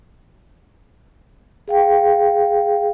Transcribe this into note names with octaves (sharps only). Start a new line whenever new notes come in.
G#4 F5 G5